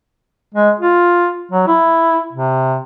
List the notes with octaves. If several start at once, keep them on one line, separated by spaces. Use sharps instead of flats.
G#3
F4
F#3
E4
C3